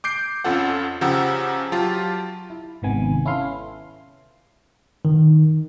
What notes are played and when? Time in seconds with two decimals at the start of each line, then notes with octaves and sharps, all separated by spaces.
0.04 D6 G6 C7 D7
0.44 F2 C#4 F4 A4 F#5
1.01 C#3 F3 G4 F#5 A#5 E6
1.72 F#3 F4 G4 A5
2.50 E4
2.82 G#1 G#2 C3 D#3 B3 G#5
3.25 C#4 E4 A4 B4 F5 C6
5.05 D#3